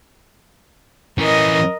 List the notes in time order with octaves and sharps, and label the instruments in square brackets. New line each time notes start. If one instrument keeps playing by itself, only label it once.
[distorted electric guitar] E3 C#4 [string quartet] A#4 D#5